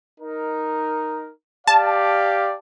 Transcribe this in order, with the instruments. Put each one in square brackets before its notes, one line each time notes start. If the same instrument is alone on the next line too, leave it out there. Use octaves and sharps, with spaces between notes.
[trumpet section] D#4 A#4
[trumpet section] G4 D5 F5 [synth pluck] A5